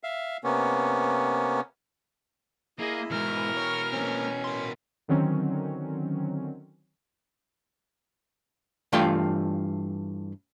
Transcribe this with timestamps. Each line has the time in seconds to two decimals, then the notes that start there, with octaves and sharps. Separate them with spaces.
0.03 E5 F5
0.44 C3 A#3 B3 C#4
2.79 A#3 E4 G#4 D#5
3.11 E2 G#2 B2 E3 A#4 F6
3.57 C#5
3.93 A#3 C4 C#4
4.44 A#4 C6
5.08 D3 D#3 F#3 C4 C#4
8.93 G2 E3 A3 F4 F5 G5